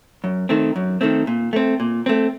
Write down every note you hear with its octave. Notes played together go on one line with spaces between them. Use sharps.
F#2
D#3 A3 C4
F#2
D#3 A3 C4
A#2
A3 C4
A#2
A3 C4